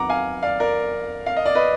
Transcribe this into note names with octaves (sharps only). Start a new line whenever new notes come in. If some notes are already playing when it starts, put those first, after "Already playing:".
Already playing: F2 D#3 F#3 B3 F#5 A#5 D6
F5 G#5
D5 F5
A#4 D5
F5
D#5
D5
B4 D#5